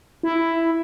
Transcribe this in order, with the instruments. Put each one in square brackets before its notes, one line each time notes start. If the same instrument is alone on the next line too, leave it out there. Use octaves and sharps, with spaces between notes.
[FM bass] E4